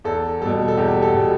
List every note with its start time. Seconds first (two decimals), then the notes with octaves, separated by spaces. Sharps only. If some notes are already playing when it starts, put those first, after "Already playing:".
0.04 E2 A4
0.41 B2 G3 A4
0.68 A4
0.77 E2 G4
1.02 A4
1.14 B2 G3